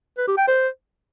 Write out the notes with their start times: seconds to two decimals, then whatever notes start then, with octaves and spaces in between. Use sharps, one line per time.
0.18 B4
0.28 G4
0.38 G5
0.48 C5